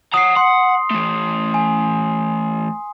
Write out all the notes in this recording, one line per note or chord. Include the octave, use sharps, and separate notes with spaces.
F#5 A#5 D#6 C7
F#5 C6
E3 A3
G#5